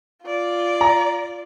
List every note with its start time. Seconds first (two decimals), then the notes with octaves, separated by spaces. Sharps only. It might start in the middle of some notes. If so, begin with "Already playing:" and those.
0.23 F4 D5
0.81 A#5